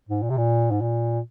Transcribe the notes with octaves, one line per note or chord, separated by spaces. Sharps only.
G#2
A#2
C3
A#2
G#2
A#2